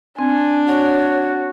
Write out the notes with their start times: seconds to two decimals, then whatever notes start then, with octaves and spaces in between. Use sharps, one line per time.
0.19 C4 D4 G#5
0.68 F#4 C#5